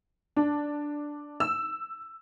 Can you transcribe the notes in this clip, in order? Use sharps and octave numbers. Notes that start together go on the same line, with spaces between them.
D4
E6